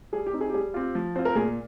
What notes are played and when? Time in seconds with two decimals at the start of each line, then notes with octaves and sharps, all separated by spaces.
0.13 G3 G#4
0.26 G4
0.33 C4 D#4
0.41 G#4
0.50 G4
0.54 G3 G#4
0.74 C4 F4 G4
0.95 F3
1.16 C4 F4 C5
1.25 A#4
1.35 A#2 G#4